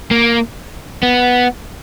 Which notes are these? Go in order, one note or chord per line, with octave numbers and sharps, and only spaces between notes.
A#3
B3